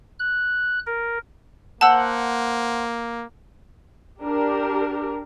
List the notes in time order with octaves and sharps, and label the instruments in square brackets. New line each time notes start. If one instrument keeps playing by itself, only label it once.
[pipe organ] F#6
A#4
[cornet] A#3 [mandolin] C5 F#5 [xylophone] A5 E6
[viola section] D4 G4 A#4